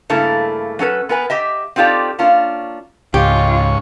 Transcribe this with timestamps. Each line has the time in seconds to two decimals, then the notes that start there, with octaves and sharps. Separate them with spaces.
0.10 G2 C#3 A3 A#3 E4 A#5
0.79 F#3 C#4 A4 B4
1.09 B3 A#4 B4 G#5
1.30 G4 D#5 E5
1.76 C4 D#4 F4 G4 A4 D5
2.19 A#3 C#4 D4 F4
3.14 C#2 G#2 C#4 F4 G4 C#6